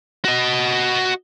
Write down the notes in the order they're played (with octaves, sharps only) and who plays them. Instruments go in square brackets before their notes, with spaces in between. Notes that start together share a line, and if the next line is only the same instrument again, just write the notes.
[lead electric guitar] F#4 D#5